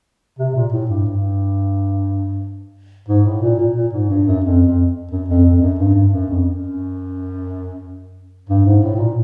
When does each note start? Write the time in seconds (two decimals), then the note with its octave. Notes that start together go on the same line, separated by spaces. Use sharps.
0.39 C3
0.55 A#2
0.72 A2
0.89 G2
1.06 G2
3.09 G#2
3.26 A2
3.42 A#2
3.59 A#2
3.76 A#2
3.93 G#2
4.10 G2
4.27 F#2
4.44 F2
4.66 F2
5.11 F#2
5.28 F2
5.45 F2
5.61 F#2
5.79 G2
5.95 G2
6.13 F#2
6.29 F2
6.46 F#2
8.49 G2
8.66 G#2
8.83 A2
8.95 A2
8.99 A#2